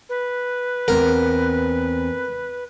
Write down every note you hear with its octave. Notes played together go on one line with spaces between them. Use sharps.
B4
E2 C4 A#4 F#5